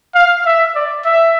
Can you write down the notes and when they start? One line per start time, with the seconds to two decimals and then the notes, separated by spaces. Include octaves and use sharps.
0.15 F5
0.46 E5
0.75 D5
1.05 E5